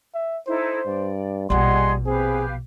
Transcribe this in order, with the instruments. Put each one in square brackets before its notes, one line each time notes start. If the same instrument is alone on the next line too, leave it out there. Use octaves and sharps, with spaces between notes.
[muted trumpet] E5
[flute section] D#4 E4 A4 [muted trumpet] C5
[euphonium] G2 [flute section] D5
[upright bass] A#1 B2 [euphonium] G3 [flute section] G#4 D#5 F#5 [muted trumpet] C6
[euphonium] C4 [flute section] G4 B4 F5 [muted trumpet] G#4